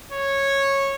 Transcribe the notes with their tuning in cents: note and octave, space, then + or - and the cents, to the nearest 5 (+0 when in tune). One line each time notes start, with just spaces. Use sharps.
C#5 -10